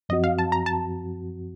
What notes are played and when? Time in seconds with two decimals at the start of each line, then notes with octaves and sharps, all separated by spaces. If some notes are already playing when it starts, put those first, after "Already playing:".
0.09 F#2 F3 C4 F#4 D#5
0.24 F5
0.39 A5
0.52 A#5
0.66 A5